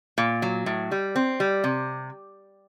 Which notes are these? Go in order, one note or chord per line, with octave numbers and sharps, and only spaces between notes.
A#2
F#3
A2
G3
C4
G3
C3